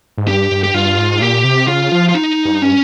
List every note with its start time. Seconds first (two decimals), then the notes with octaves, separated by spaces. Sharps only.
0.18 G#2
0.28 G2 G4
0.51 G2
0.63 G4
0.74 G2 F4
0.97 G#2
1.21 A#2 G4
1.44 C3
1.67 C#3 F4
1.92 F3
2.09 F4
2.14 D#4
2.45 G2
2.62 C#4